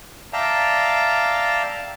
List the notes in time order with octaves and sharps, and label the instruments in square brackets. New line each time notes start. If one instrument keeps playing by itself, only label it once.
[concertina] D5 E5 F5 G5 A5 A#5